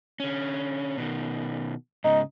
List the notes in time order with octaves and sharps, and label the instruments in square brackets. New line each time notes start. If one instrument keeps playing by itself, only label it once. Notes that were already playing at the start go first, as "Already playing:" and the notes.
[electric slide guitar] D3 C#4
B2 D#3
[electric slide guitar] G#2 C#3 [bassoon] D#4